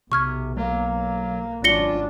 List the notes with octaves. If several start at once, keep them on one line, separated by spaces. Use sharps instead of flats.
B1 C3 C#6 F6 G#6
F#3 A#3
G#1 F#3 C#4 D4 F4 A#6 C#7 G7